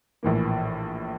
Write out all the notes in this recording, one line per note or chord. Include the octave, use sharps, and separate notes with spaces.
A#1 A2 E3 A#3